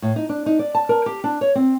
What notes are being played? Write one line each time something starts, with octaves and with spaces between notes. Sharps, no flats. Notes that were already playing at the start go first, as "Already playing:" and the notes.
A2
D#4
D4
D#4
D5
A5
A#4
G4
D4
C#5
C4